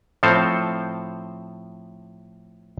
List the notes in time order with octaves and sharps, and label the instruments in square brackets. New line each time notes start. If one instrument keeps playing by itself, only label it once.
[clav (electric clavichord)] A2 F3 C4 A4 C5 F5